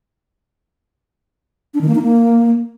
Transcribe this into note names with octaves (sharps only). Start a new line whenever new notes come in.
D4
D#3
A#3
D#4
A#3